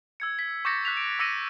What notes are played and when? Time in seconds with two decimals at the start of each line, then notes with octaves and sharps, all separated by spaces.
0.20 E6 G#6 C#7
0.39 B6
0.65 C#6 D6 G6 A6 A#6 C#7
0.85 F#6 B6 F7
0.97 D7
1.19 D6 E6 A#6 C#7 D#7